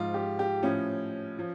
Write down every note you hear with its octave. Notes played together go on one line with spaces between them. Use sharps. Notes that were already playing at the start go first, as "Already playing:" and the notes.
Already playing: G#2 F3 F4
G4
G4
A2 F3 C#4
F3